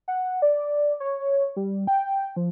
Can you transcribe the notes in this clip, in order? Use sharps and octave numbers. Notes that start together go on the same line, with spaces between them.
F#5
D5
C#5
G3
G5
F3